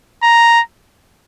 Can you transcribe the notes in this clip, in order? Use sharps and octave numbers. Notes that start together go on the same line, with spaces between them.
A#5